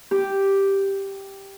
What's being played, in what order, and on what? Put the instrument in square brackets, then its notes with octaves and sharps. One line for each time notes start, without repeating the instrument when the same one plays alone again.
[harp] G4